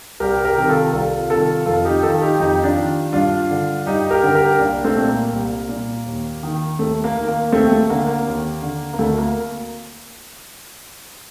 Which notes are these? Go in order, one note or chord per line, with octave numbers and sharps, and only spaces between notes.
C2 G4 A#4
G4 A#4
C3 D#3
F4 A4
C2 F4 A4
C3 D#3 F4 A4
F2 F4 A4
D#4 G4
D#3 F4 A4
D#4 G4
F2 D#4 G4
D4 F4
D#3
G2 D4 F4
D3
G2 D#4 G4
G4 A#4
D3
G4 A#4
C2 A#3 D4
A3 C4
A#2
A#3
C2
A#2
D#2
D#3
D#2 A3
A#3
D#3
A#3
D#2 A3 C4
A3
D3 A#3
A#3
D#2
D3
A#3
D2 A3
A#3